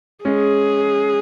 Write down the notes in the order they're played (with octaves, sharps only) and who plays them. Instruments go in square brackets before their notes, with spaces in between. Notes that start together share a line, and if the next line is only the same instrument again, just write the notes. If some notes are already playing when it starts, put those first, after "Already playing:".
[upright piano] G#3 C#4 [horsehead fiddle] G#4